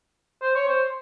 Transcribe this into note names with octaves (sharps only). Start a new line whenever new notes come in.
C5
C#5
C5